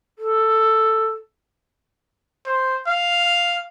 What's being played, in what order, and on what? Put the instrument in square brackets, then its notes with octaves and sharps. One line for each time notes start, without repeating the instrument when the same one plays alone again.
[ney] A4
[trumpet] C5
F5